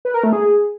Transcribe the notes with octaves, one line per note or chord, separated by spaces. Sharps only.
B4
A#4
A3
G#4